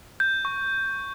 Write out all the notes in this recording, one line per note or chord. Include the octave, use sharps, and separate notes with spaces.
G6
C#6